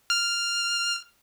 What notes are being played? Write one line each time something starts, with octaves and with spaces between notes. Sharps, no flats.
F6